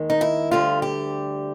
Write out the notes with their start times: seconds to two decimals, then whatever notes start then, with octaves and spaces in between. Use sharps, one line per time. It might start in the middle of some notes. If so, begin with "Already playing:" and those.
Already playing: D#2 D#3 G#3
0.10 D#4
0.21 E4
0.51 D2 D3 G3 F4
0.82 G4